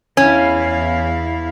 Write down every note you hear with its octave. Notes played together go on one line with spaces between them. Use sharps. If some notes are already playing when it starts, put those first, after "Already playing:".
E2 C#4 E4 F5